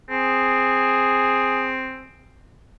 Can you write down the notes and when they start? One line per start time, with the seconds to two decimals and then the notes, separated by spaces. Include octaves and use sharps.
0.10 C4 G#4